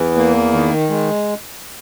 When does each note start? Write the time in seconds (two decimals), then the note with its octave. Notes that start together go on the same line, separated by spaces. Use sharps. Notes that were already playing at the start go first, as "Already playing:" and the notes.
Already playing: E2 E3
0.16 A#3
0.53 D#3
0.90 G#3